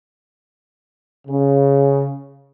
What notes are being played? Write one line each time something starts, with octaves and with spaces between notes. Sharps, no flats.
C#3